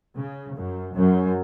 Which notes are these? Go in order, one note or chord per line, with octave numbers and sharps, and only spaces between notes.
C#3
F#2
F#2